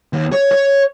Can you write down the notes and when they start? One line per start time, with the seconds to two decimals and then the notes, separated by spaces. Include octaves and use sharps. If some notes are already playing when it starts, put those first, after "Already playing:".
0.13 D#2
0.32 C#5
0.52 C#5